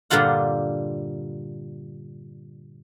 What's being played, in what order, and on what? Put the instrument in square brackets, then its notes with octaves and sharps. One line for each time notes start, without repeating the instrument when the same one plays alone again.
[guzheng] G2 A#2 D3 G3 F4 F#5